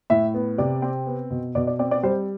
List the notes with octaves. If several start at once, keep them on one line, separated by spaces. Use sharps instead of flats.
A2 E5
B3
C3 D5
C4
B3
B2
B2 D5
D5
C4 D5
D5
G3 C5